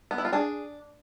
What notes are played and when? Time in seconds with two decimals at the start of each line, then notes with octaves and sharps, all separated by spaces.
0.11 B3
0.18 E4
0.25 F4
0.33 D4 G#4